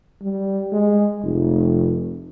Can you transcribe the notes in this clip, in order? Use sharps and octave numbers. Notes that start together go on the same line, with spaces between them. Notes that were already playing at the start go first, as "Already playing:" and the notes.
G3
G#3
F1